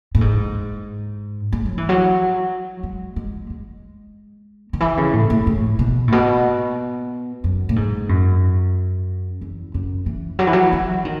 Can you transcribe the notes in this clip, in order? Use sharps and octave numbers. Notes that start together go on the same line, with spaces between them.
A2
G#2
G#3
F#3
E3
F#3
G#3
G#3
G#3
D#3
E3
C#3
A2
A2
A2
B2
A2
B2
F#2
A2
G#2
F#2
E2
F#2
E3
F#3
E3
F#3
E3
D#3